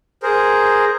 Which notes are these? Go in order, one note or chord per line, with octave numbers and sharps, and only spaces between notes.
G#4 A#4 C5